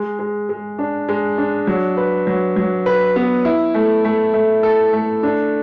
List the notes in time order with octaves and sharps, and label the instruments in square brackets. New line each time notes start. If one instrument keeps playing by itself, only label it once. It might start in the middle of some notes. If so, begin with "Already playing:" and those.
Already playing: [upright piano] G#3
G#3
G#3
D4
G#3
D4
F#3
B4
F#3
F#3
B4
B3
E4
A3
A3
A3
A4
A3
D4